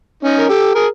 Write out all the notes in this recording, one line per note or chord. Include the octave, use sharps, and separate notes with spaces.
C#4 D#4
A#4
G4 A4
G#4 A#4